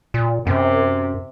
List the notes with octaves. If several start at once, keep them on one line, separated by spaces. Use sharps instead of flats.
A#2
F#2 C3